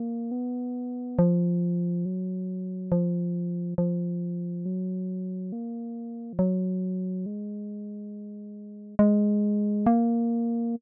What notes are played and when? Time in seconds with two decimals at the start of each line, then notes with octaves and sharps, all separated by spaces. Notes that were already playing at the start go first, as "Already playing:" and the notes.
Already playing: A#3
0.31 B3
1.19 F3
2.05 F#3
2.92 F3
3.78 F3
4.66 F#3
5.52 A#3
6.33 F3
6.39 F#3
7.26 G#3
8.99 G#3
9.87 A#3